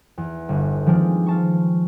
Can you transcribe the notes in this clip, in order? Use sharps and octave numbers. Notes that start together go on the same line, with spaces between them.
E2
G1
D#3 F3 G#3 C4 D4
F4 A5 C#6